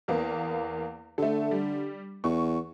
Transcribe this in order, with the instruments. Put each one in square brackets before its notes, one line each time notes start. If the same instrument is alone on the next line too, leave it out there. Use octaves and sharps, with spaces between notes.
[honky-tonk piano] E2 A#3 B3
[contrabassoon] D3 [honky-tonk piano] A3 A4
[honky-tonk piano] G3
[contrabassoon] E2 [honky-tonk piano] C#6